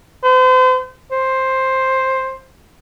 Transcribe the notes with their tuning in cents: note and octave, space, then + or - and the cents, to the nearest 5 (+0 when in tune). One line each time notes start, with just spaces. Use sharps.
C5 -40
C5 +10